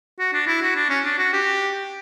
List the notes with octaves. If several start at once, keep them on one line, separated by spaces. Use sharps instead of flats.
F#4
D4
E4
F#4
D4
C#4
D4
F#4
G4